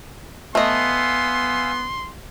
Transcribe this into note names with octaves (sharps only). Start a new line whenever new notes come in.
A3 B3 D#5 F5 G#5 C6 E6